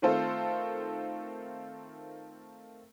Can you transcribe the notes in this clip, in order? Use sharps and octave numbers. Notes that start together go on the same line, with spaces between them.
D#3 A3 C4 F4 A4 C5